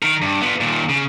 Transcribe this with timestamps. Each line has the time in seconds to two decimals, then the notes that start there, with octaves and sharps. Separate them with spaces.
0.03 D#3 A#4
0.22 G2
0.41 B3 F4
0.60 D#2 A#2
0.89 C#3